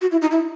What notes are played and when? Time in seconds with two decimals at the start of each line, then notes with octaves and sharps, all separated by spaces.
0.01 F#4
0.12 E4
0.22 D#4
0.31 E4